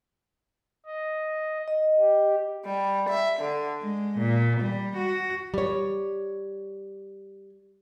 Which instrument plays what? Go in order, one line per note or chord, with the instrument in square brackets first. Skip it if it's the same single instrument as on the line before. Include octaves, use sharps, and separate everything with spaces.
[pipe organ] D#5
[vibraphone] D#5
[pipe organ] G4
[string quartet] G3
E5
D3
G#3
A#2
G3
F#4
[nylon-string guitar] G3 C#5